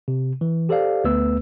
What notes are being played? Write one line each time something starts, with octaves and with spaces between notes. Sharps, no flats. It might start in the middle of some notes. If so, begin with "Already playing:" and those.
C3
E3
G4 A4 C5 D5 F5
D2 A3 B3 B4 E6